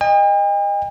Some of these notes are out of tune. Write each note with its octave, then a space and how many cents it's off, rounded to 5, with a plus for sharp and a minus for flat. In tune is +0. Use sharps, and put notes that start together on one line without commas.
D#5 -15 G5 +45